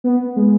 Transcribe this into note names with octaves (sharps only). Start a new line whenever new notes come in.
B3
G#3